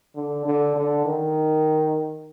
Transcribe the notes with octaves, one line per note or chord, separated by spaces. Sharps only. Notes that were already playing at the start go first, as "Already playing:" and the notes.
D3
D3
D3
D#3